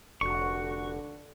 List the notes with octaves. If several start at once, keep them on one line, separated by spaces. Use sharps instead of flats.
F1 D3 F#4 C#6